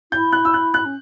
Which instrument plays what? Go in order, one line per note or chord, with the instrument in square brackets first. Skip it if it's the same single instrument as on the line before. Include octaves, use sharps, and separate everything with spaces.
[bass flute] E4 [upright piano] G6
[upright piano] F#6
E6
F#6
F#6
[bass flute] C#4